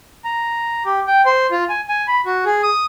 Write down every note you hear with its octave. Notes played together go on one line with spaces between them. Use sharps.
A#5
G4
G5
C5
F4
G#5
G#5
B5
F#4
G#4
D#6